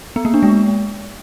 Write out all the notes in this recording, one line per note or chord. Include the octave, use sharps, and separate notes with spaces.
B3
A#3
D4
G#3